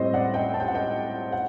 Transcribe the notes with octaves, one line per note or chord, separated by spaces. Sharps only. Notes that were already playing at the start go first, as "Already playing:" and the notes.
Already playing: A2 G3 C4 C5 D#5
D5 F#5
D#5 G5
A5
G5
F#5
D#5 G5
F#5